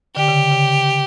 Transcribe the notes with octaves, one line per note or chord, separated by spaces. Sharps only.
D3 G4
C#3
C#3